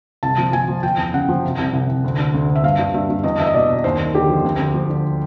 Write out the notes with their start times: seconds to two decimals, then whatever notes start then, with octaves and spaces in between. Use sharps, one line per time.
0.23 C2 A5
0.38 F3
0.53 F3 G#5
0.68 F3
0.83 F3 G5
0.98 E2
1.14 C#3 F#5
1.29 F3
1.44 C3
1.58 C2
1.73 C2
1.89 C2
2.04 D2
2.18 D3
2.34 D2
2.49 D2
2.56 E5
2.63 G2 F5
2.79 G2
2.94 G2 E5
3.09 G2
3.23 E2 D#5
3.39 E2 E5
3.46 D#5
3.54 B2 D5
3.69 B2
3.84 D#2 C5
3.99 D#2
4.14 D3 G4
4.29 F3
4.45 D2
4.59 D2
4.74 F3
4.90 D3